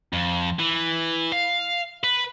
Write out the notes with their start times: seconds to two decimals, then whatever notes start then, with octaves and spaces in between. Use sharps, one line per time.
0.13 F2
0.59 E3
1.32 F5
2.04 B4